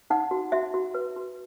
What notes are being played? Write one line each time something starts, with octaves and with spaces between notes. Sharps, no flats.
D#4 F#5
F#4
F#4 E5
F#4
B4
F#4